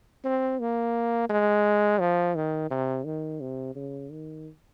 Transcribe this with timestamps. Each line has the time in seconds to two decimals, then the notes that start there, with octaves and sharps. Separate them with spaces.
0.24 C4
0.60 A#3
1.30 G#3
2.00 F3
2.36 D#3
2.71 C3
3.06 D#3
3.41 C3
3.75 C#3
4.11 D#3